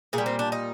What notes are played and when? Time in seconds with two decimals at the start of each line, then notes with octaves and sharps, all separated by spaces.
0.13 A#2 G#4
0.18 G3
0.26 C4
0.39 D4
0.52 D#4